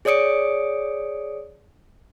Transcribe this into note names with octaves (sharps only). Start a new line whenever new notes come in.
G#4 C#5 D5 D#6 C#7 D7